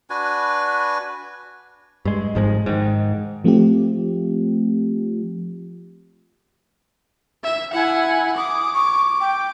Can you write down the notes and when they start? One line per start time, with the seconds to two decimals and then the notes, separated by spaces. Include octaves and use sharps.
0.10 D4 F#4 B4 G#5
2.05 G2 G#3
2.35 G#1 G#2 F3 G#3
2.66 G#2 D#3
3.44 F3 A3 C4 F4 G4
7.44 E5
7.74 E4 F#5 G#5
8.37 D6 D#6
8.74 C#6
9.21 G5